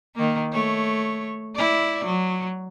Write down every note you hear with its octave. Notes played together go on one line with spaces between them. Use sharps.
D#3 A#3
A3 C#5
E4 D5
F#3